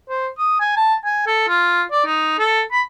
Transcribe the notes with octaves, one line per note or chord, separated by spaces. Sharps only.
C5
D#6
G#5
A5
G#5
A4
F4
D5
D#4
A4
B5